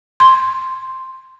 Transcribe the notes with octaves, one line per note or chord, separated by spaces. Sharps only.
C6